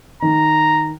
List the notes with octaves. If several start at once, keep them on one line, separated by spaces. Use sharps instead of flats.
D#3 A#5